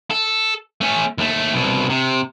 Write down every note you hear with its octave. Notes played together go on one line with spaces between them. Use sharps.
A4
A3 C#4
D#2 A3
C2 B2
C3